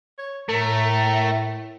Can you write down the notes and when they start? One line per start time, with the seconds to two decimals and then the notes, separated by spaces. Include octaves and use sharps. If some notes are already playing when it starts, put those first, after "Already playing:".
0.19 C#5
0.49 A2 A3 A#4